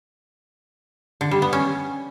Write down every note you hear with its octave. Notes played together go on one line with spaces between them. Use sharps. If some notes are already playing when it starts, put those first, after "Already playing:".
D3
G3
B3
C#4